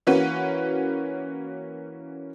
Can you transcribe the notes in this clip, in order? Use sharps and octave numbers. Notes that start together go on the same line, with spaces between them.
E3 A#3 C#4 F#4 B4